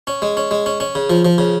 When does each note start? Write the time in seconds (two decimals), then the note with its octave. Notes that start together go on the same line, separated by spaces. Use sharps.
0.07 C#4
0.22 G#3
0.37 C#4
0.51 G#3
0.66 C#4
0.80 C#4
0.95 C#3
1.10 F3
1.25 F3
1.38 C#3